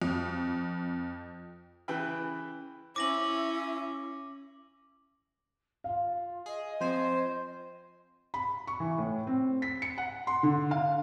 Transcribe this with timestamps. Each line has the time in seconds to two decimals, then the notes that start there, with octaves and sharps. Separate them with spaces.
0.02 F2
1.88 C#3 E3 B4 G5 B5
2.96 C#4 E4 D6 A#6 F#7
5.84 F4 F5
6.46 G#4 D#5
6.81 F3 C4 C5 G#5
8.34 B5
8.67 C#6
8.80 E3
8.98 A2
9.27 C4
9.62 B6
9.82 C#7
9.98 F#5
10.27 C6
10.43 D3
10.71 F5